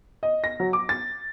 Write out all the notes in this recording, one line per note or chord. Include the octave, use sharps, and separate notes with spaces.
D#5
A#6
F#3
D6
A6